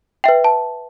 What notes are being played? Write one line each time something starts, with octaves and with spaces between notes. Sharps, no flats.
B4 E5 G5
A5